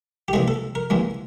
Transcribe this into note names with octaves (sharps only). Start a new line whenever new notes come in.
G4
D#2 C#3 E3 G#3 G#4
A4
A#4
D#2 C#3 E3 G#3